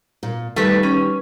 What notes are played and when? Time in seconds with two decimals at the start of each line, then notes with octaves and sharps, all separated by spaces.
0.23 A#2
0.56 D#3 G3 A3 B4
0.83 C#4